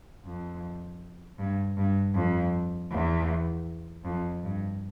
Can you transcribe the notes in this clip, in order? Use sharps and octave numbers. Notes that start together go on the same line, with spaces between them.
F2
G2
G2
F2
E2
F2
G2